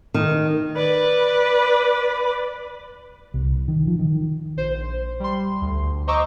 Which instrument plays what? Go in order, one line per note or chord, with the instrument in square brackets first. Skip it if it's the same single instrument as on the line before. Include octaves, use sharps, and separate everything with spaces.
[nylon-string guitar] D#3
[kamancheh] B4 D5
[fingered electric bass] C2
D#3
F3
D#3
[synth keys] A#1 C5
G3 C6
D2
C5 D#5 A#5 C#6 D6 E6